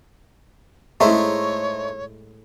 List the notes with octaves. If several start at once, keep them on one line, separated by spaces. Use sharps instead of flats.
A2 G#3 A3 D#4 C5 C#5 E5 A#5